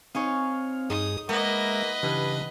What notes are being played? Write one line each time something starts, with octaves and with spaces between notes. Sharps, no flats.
C4 D#4 G#4 C#5 F5
G2 D#4 G#4 D#6
G#3 A#3 B3 B4 D#5 E5
G2 C#3 E3 B5